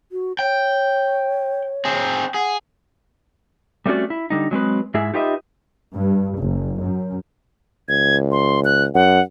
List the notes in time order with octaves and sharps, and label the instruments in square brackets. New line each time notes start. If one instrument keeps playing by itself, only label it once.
[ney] F#4
[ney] C#5 [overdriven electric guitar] G5
[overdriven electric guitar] C4 G#4
[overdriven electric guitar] G#4 [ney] F#5
[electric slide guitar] G3 A3 C4 C#4 F#4 D5
E4
D3 G3 D#4
F#3 G#3 C4 B4
G#2 G#3 E4 G#4 E5
D#4 F4 G4 B4 D#5 E5
[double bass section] G2
F#1
F#2
[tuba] C#2 [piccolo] G#6
[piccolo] C6
F#6
[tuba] F#2 [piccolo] F#5